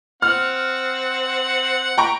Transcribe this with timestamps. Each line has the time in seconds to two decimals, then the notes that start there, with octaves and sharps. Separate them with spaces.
0.22 C4 F#5 F6
1.98 B4 G5 A#5 C#6